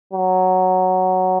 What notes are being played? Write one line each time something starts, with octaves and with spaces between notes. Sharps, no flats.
F#3